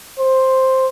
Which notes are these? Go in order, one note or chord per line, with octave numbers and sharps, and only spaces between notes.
C5